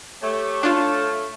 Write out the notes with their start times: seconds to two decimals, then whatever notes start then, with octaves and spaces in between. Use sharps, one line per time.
0.22 A3 G4 C#5
0.63 D4 F4 F5 A5